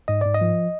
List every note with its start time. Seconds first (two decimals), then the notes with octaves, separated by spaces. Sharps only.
0.08 G#2 D#5
0.21 G#2 D5
0.34 D#5
0.41 F3